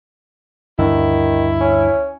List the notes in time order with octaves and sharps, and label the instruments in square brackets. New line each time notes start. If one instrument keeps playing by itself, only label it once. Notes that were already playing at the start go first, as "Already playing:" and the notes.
[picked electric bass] D2 G2 D3 [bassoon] D#3 [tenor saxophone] E4
[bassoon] C#4